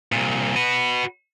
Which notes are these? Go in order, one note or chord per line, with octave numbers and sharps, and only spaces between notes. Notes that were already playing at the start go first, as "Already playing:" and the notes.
C2 A#2
F#4 B4